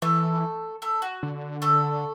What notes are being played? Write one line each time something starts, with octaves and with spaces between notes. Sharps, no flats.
E3 A3 A4
A3 A4
F#4
D3
A3 A4